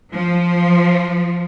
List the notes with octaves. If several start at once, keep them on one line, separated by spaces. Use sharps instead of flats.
F3